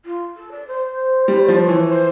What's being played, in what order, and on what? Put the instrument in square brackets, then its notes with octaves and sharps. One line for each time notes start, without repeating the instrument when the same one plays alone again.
[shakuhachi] F4
A4
D5
C5
[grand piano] G3
F3
E3
[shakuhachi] C5